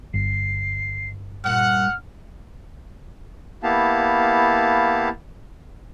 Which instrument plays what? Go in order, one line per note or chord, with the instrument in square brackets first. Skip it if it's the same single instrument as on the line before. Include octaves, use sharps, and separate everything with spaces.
[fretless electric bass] G1 [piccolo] C7
[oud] G2 A#2 [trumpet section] F#5 [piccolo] F6
[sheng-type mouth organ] A#3 B3 E4 G4 F5 A5